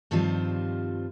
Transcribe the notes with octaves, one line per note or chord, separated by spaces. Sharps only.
G2 D#3 F3 G3 C4 F4